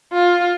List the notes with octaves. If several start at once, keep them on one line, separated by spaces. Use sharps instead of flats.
F4